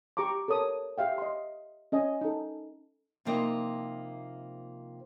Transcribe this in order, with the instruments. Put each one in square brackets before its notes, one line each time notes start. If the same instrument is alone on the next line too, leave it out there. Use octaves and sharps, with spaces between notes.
[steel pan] G4 A#5 C#6 D6
A4 A#4 C#5 D#6
G4 E5 F5 G5
D#5 C6
C#4 D#5 G#5
D#4 A4
[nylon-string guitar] C3 F3 A#3 C4 D#4 E4